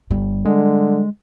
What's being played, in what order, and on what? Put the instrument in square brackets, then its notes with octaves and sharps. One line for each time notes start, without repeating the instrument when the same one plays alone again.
[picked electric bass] G1 [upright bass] G3
[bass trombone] D3 [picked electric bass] G#3